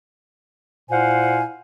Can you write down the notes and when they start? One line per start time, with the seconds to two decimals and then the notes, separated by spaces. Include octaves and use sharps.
0.90 A#2 E4 C5 F5 F#5 G#5